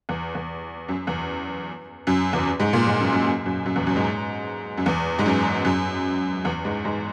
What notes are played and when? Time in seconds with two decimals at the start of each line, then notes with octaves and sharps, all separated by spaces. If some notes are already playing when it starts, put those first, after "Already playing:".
0.09 E2
0.35 E2
0.89 F#2
1.07 E2
2.07 F#2
2.33 E2
2.60 G#2
2.73 A#2
2.87 G#2
3.00 F#2
3.13 F#2
3.26 F#2
3.46 F#2
3.66 F#2
3.76 E2
3.87 F#2
3.96 G#2
4.77 F#2
4.86 E2
5.19 G#2
5.26 F#2
5.65 F#2
6.45 E2
6.65 G#2
6.85 G#2